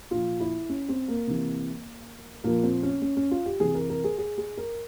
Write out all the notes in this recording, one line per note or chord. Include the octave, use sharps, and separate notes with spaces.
A#2 F3 F4
E4
C#4
C4
A#3
C3 E3
A#2 F3 A#3
C4
C#4
C#4
C#4
F4
G4
C3 E3 G#4
A#4
A#4
G#4
G#4
G#4
A#4